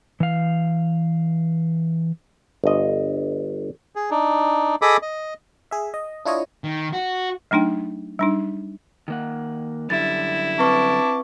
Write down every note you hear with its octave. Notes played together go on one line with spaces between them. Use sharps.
E3 F5
G1 D#5
G#4
D4 D#4
G#4 A4 D#5 B5 D6 D#6
D#5
G#4 E5
D#5
D4 E4 F4 C#5 D#5
D#3
F#4
F#3 A3 D4 D#4 G5
G3 D4 D#4
D#3 A#3 F#5
F#2 D3 G3 E4 A6
C4 B4 A5 C#6 D6